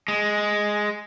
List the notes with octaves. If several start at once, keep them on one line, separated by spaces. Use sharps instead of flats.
G#3